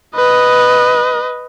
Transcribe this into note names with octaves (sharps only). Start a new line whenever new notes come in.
B4 D#5